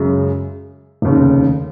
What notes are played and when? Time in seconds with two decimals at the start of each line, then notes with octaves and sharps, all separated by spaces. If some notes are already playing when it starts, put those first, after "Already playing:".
Already playing: F#2 C#3 G#3
1.02 F1 D#2 C#3